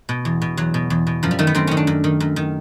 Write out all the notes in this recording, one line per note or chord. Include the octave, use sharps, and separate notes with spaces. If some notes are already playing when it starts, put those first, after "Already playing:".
B2
E2
B2
E2 F#3
B2
E2
B2
F#2 F3
G3
D#3 A3
B3
F#2 C4
D#3 C#4
D4
F#2
D#3
F#2
D#3